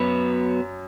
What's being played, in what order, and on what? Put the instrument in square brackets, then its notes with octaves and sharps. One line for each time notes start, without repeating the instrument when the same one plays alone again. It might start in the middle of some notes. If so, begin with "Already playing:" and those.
Already playing: [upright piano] F#2 [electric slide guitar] F#3 B3 F#4 B4